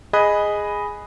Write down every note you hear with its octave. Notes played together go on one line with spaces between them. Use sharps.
G#4 D#5 G#5 B5 D#6 F#6